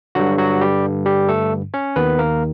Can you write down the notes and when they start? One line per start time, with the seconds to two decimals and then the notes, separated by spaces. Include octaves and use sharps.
0.15 G2 D3 F#3 F#4
0.38 F#3 F#4
0.61 G3 G4
1.06 G3 G4
1.29 A3 A4
1.74 C#4 C#5
1.96 D#2 D#3 B3 B4
2.19 A#3 A#4